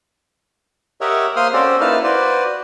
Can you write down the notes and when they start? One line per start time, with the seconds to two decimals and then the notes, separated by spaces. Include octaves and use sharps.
1.01 G4 A#4 C#5 D#5 E5 F#5
1.36 A#3 C5 C6 D#6 F6
1.53 C4 C#4 F#4 A4 C5 D5
1.81 A#3 D#4 E4 B4 A5 F6
2.03 F#4 B4 C5 D5